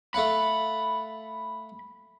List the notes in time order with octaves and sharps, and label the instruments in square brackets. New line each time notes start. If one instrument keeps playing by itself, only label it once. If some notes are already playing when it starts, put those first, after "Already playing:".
[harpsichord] A3 F5 F#5 [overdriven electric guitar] B5